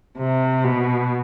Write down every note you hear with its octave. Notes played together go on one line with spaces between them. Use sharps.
C3
B2